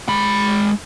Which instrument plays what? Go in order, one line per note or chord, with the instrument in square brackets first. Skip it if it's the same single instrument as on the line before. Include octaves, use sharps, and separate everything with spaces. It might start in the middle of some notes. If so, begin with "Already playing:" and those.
[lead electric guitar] G#3 B5